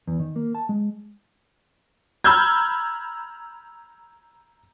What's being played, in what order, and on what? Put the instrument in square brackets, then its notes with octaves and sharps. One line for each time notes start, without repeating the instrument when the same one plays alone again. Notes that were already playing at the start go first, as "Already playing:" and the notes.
[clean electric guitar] E2
D#3
A#3
A5
G#3
[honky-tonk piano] A#5 B5 E6 F6 G6 G#6